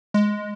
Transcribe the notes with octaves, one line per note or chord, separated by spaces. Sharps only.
G#3